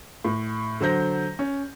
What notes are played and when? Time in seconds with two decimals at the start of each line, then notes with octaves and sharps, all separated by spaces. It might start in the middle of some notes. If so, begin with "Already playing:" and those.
0.25 A2
0.81 D3 F#3 C5 G6 A#6
1.39 C#4